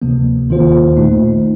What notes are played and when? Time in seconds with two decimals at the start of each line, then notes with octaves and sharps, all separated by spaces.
0.02 D2 C3 F3 A#3
0.49 D#2 D#3 A#3 F4 C5
0.97 A#1 A#2 A3 D#4